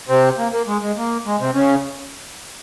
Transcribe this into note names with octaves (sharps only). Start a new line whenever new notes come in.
C3 C4
A#3
A#3
G#3
G#3
A#3
G#3
C3 C4
C#3 C#4